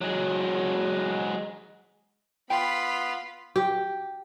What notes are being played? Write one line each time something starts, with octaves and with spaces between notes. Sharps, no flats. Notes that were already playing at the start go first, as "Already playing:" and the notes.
F#3 G#3
B3 F4 G5 B5
G4